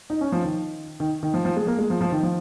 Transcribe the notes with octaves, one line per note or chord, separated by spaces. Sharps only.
D#4
C#4
F3
D#3
D#3
D#3
F3
F3
G#3
A#3
G#3
F3
F3
D#3
F3